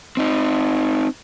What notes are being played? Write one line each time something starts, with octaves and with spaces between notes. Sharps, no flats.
C4 D#4